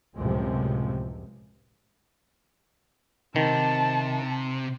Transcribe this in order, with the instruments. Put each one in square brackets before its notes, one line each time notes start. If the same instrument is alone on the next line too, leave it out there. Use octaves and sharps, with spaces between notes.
[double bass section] C#2 F#2 A2 C3 F3 G#3
[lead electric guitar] C3 [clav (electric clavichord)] D#3 [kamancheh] A5